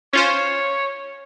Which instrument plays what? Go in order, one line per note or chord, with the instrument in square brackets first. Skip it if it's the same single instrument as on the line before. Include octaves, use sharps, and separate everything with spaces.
[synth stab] C#4 F4 C5 [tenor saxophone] C#5